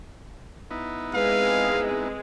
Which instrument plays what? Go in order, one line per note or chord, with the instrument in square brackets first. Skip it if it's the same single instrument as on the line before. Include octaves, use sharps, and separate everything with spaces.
[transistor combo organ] B3 D#4 E4
[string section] G#3 C4 [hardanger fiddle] B4 [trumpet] F5